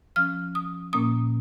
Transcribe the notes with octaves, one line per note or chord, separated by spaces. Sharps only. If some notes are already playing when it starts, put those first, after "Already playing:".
F3 C#4 F6
D#6
A#2 A#3 C#4 D#6